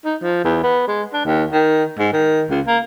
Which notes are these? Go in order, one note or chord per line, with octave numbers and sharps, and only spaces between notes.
D#4
F3
E2
B3
G#3
D4
D#2
D#3
G#2
D#3
C#2
A#3